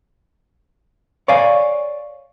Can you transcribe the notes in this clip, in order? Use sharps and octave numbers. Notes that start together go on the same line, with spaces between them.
C#5 D5 F5 G#5